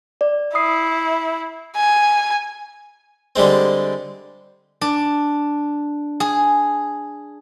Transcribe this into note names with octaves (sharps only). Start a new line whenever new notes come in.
D5
E4 D#6 C7
G#5
D3 G3 G#3 C4
D4
G#4